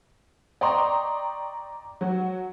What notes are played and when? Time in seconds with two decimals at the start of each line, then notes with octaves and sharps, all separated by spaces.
0.61 D5 D#5 G5 A#5 C6 C#6
2.01 F#3 F#4